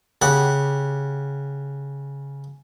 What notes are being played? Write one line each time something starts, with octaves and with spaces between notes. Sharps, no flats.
C#3 G4 F#5